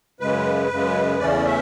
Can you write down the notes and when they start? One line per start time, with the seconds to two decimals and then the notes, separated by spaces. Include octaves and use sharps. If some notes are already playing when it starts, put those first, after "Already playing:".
0.20 F#2 C#3 G#3 B4
0.70 F#2 C#3 G#3
1.20 E2 C#3 E3 A3 C#4 D5
1.45 E5